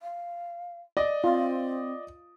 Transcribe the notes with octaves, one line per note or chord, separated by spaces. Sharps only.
F5
D5 D#5 D#6
C4 F4